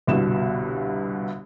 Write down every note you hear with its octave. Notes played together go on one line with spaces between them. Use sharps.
G1 C2 G2 B2 E7